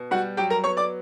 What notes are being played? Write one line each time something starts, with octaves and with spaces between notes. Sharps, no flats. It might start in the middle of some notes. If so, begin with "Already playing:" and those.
Already playing: B2
G3 F#4 F#5
F#3 G4 G5
A#4 A#5
B3 C#5 C#6
D5 D6